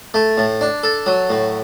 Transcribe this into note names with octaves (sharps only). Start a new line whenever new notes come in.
A3
A2
D4
A4
F#3
A2